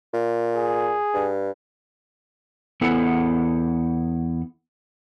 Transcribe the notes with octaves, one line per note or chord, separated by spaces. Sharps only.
A#2
G#4
G2
E2 B3 E4 A4 F#5